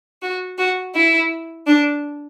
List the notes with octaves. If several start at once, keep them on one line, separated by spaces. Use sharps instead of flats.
F#4
F#4
E4
D4